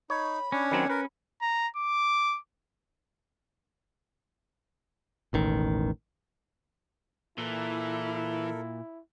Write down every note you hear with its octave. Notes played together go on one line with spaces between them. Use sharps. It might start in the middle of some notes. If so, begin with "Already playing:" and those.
D#4 C#5 B5
C#4 D4 C#5
D#3 F#3 C4 B5
A#4 B4 B5
A#5
D6
E1 A1 D#3
A#2 E3 E4 A4 A#4